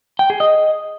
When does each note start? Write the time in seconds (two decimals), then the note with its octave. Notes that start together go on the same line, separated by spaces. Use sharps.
0.19 G5
0.30 G#4
0.40 D#5